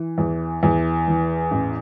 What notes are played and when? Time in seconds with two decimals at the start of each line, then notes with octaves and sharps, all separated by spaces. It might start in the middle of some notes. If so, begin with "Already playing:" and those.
Already playing: E3
0.18 E2
0.63 E2
1.08 E3
1.51 A1